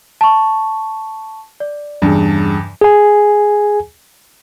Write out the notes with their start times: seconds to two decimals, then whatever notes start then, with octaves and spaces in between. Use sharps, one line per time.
0.21 A5 C#6
1.60 D5
2.02 E2 G2 C#3
2.81 G#4 G#5